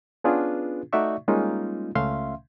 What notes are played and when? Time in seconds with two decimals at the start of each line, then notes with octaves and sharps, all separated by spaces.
0.24 B3 C#4 D4 F4 G#4 B4
0.93 A3 D#4 F#4 D5 E5 C#6
1.28 G3 G#3 A#3 C#4 D#4 F4
1.95 C#2 A3 C#4 E5 F5 C6